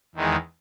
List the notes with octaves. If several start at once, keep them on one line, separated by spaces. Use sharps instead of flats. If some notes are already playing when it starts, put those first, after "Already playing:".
E2 D#3 G#3